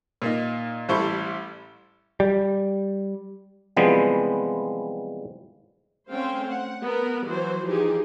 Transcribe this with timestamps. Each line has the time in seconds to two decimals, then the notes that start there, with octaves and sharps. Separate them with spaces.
0.22 A#2 A#3 D#4
0.89 A1 G3 E4 A4 C5 C#6
2.20 G3
3.77 C3 E3 F3 G3 G#3 B3
6.11 A3 C4 C#4 C5 F5 G5
6.50 F#5
6.83 B3 A#4
7.27 E3 F#3 F#4 C5
7.65 E3 F3 D#4 G4 G#4